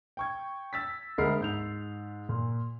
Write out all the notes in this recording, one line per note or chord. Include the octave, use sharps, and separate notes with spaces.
G5 C#6 G#6
E6 A6 B6
D2 G#3 A#4 B5 C7
G#2 G6 F7
A#2